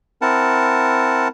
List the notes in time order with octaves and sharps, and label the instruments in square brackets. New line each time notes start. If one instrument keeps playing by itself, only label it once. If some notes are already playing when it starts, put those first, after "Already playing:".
[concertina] C4 E4 A#4 F#5 A5